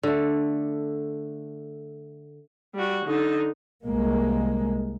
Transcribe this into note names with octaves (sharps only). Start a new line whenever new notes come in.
D3 A3
G3 F#4
D3 D#4
C2 G#3 A#3